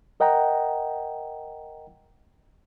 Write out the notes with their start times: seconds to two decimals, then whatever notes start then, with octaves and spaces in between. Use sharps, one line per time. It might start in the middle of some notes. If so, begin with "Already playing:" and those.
0.20 A#4 D#5 F#5 G5 A#5